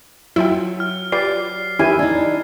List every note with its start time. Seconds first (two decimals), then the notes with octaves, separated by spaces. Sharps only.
0.36 F#3 E4 F4 G5
0.80 F6
1.12 F4 G4 B4 D5 C7
1.79 D#3 C#4 E4 G4 G#5
1.99 D4 D#4